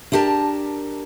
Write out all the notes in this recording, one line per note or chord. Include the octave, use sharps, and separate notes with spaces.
D4 E4 G4 A#4 A5